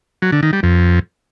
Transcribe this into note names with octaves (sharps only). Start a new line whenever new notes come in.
F#3
D3
D#3
G3
F2